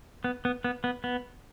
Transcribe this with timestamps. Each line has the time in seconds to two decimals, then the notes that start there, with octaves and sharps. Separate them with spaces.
0.24 B3
0.45 B3
0.64 B3
0.84 B3
1.04 B3